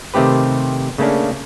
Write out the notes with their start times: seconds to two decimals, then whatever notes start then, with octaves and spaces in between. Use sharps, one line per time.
0.14 C3 D#3 A3 C4 G4 B4
0.98 C#3 A3 A#3 C#4 D4